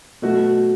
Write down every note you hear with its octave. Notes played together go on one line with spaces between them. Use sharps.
B2 F#3 A3 F#4